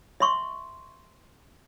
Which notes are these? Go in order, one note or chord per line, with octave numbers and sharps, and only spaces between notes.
D#5 E5 C6 C#6